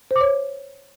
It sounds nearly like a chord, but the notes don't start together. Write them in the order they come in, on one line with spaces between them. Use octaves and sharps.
C5 D6 C#5